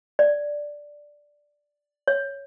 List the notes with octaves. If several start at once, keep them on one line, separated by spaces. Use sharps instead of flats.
D5
C#5